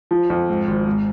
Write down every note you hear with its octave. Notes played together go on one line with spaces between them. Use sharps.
F3
F2
G#2
G#1
G#2